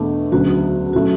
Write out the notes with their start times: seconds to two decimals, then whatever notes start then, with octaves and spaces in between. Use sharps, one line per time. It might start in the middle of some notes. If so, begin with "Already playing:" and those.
Already playing: E2 B2 A3 D4
0.32 D2 C#3 F#3 F#4
0.93 C#3 F#3 A3 E4 F#4